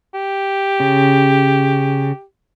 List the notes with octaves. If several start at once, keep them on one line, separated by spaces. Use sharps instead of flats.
G4
C#3